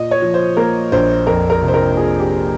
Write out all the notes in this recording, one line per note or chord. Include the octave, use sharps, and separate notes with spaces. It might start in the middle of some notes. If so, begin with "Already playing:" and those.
Already playing: A#2 D#5
C#5
F3
C5
A#3 A#4
A#1 C5
F2 A#4
A#4
C3
C5
A#4
F3 G#4
G4